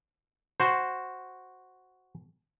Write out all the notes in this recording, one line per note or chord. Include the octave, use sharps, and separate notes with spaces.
F#4 C5